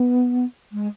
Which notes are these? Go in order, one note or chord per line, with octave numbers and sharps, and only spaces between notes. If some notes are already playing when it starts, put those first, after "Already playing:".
Already playing: B3
G#3